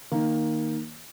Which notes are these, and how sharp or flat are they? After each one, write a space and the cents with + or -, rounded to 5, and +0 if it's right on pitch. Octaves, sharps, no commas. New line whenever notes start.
D#3 +0 A#3 +0